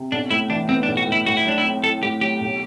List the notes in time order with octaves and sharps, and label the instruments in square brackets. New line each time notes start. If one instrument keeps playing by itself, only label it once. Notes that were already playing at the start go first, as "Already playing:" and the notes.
Already playing: [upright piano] C3
[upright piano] B1 [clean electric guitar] D4
[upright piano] A2 [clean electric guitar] E4
[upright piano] E3 [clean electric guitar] D4
[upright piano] B3 [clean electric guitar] C4
[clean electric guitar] D4
[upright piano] B1
[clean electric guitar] F#4
[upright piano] A2
[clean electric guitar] E4
[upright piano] A2 [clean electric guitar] F#4
[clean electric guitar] E4
[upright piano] F#3 [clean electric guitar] D4
[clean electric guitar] E4
[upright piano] C4
[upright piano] E4 [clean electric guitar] A4
[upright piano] A2 [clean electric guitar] G4
[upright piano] F#3 [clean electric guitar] G4
[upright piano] B1